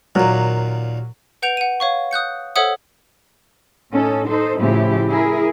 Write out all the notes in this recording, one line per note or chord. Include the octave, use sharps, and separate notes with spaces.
D#2 A#2 F#3 A#4
B4 F#5 G6 D7 F7
F#5 D#7
C#5 F5 C#6
D#6 F#6 G6 C#7
A4 C5 C#5 E5 F#5 D#6
A2 C#4 D#4 A4
D#4 A4 C5
A2 C#3 F3 E4 G4
E4 G#4 A#4